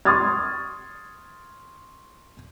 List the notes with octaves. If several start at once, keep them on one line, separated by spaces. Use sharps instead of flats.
C6 C#6 D#6 F6 G#6 A6